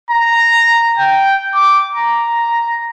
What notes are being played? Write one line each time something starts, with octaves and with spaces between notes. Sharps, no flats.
A#5
G5
D6
A#5